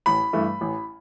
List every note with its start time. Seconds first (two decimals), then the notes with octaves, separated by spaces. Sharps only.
0.06 A1 B5
0.33 G2 E3 A3
0.61 A1